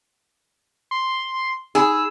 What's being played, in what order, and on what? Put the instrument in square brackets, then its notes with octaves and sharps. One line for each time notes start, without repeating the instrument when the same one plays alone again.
[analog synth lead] C6
[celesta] D#4 G#5 B5 [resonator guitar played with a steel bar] G#4 [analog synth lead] E6